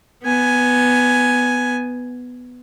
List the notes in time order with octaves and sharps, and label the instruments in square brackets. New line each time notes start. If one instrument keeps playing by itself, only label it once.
[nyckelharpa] B3 G#5